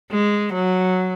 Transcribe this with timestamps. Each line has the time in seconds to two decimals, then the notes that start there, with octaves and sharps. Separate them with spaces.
0.11 G#3
0.54 F#3